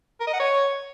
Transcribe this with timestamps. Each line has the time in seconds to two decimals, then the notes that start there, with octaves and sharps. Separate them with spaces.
0.20 A#4
0.27 D#5
0.33 F#5
0.40 C#5